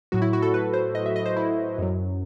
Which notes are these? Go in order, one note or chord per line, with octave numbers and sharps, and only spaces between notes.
A2 F#3 F#4
E4
F#4
A4
B4
C5
D#5
E5
D#5
C5
E4
F#2 F#3